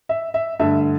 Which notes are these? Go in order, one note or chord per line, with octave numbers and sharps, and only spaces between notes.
E5
E5
G2 D3 A3 E5